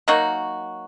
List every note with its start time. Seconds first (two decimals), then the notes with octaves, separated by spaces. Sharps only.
0.08 F#3 A#3 D#4 F#4